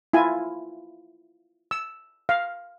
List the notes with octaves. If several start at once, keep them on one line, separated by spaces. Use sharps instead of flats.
E4 F4 G#5
E6
F5